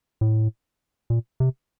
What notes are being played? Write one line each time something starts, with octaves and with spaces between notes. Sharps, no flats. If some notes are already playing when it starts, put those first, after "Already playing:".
A2
A#2
C3